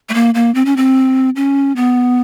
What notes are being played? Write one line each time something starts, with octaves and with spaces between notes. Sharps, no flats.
A3
A#3
A#3
C4
C#4
C4
C#4
B3